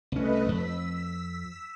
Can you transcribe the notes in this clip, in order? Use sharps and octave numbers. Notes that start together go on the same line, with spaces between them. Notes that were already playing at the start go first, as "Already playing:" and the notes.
C2 A3 C#4 B4 D#5
F2 E6 B6